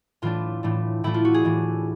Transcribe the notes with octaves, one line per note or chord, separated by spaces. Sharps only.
A2 E3 A3 D4 F4
A2 E3 A3 D4
A2 E3 A3 D4 E4
F4
F#4
G#4
A2 E3 A3 D4